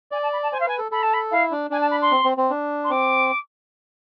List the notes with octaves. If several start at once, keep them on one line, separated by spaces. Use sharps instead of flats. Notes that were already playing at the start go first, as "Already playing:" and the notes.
D5 G#5
A5
B5
A5
C5 G#5
F5
B4 G#5
A4
A4 B5
A5
B5
E4 F5
D4
D4 G#5
A5
B5
C6
C4
C4
C4
D4
C6
C4 D6